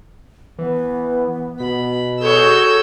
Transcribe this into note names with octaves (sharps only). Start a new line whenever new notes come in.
E3 B3
B2 B5
F#4 G#4 A4 C#5 E6 G6